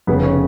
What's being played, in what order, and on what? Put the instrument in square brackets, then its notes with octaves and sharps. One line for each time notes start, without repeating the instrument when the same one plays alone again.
[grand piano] F1 F2 C#3 B3
C#4